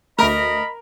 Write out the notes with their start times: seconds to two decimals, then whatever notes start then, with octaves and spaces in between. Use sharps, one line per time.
0.19 D2 A3 A#4 D#5 B5